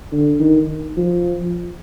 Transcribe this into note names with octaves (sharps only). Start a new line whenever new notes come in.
D3
D#3
F3